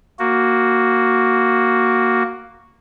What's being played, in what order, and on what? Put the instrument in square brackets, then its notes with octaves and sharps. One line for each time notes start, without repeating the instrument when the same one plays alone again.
[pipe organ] A#3 F#4